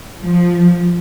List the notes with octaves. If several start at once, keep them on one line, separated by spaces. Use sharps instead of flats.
F3